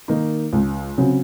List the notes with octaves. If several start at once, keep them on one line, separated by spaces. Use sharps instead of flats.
D#3 A#3 D#4
C#2
C#3 F#3 C4